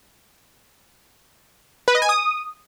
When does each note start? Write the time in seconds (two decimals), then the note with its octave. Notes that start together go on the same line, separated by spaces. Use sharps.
1.88 B4
1.95 D#5
2.02 G#5
2.09 D#6